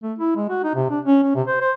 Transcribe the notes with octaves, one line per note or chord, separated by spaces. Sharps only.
A3
E4
G#3
F#4
D#4
C3
D4
C#4
C#4
C3
C5
C5